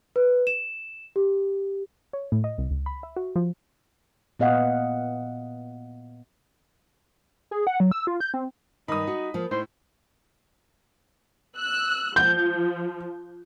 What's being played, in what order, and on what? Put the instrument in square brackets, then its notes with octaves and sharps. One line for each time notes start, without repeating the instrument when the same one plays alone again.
[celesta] B4
E7
G4
[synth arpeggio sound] C#5
A2
D#5
C2
C#2
B5
E5
F#4
F3
[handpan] A#2 B3 D#5 F5 F#5
[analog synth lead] G#4
F#5
F#3
E6
F4
G6
C4
[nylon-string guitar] G2 D#3 [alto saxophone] D#4 [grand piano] B5 D#6
[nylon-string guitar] F#4
F3 A#3 F4
[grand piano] A2 [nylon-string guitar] D#4 [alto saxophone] C5
[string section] E6 F#6
[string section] F3 [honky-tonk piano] G6